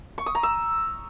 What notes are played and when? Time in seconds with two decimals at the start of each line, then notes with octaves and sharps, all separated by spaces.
0.18 C#6
0.26 D#6
0.35 A#5
0.43 E6